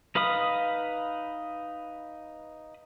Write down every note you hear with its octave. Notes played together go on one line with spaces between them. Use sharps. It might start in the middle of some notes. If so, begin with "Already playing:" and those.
D#4 B4 F5 B5 D#6